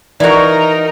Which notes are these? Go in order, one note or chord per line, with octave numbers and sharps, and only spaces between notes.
E3 D#4 F#4 A#4 D5